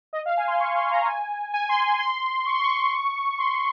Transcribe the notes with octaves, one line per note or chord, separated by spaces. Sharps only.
D#5
F5
G#5
C6
C#6
C6
A#5
G#5
G#5
C6
C6
C6
C#6
C6
C#6
C6